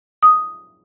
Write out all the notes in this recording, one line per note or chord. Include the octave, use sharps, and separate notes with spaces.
D#6